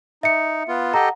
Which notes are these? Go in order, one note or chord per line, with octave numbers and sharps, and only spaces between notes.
D#4 E5 C#7
B3 F4
G4 A4 D#5 F#5 A#5